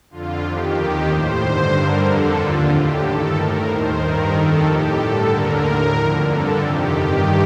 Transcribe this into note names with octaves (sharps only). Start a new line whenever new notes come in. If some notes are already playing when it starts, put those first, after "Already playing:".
F2 D3 F4
F2 D#3 G4
D#2 D#3 G4
A2 C5
G2 D3
G2 D3 A#4
F2 D3 A4
D#2 D3 F4
A2 G4
G2 D#3 A4
A2 A#4
D#2 D#3 C5
G2 D#3 A#4
F2 D#3 A4
A2 G4
G2 D3 A4
D#2 D3 A#4
A2
F2 D3
G2 D3 A4
F2 C3 D#3 G4
G2 D#3 G4